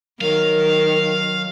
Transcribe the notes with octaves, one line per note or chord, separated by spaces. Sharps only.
D#3 F#3 A#4 F5